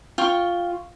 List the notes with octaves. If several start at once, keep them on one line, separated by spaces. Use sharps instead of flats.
F4 G5 C#6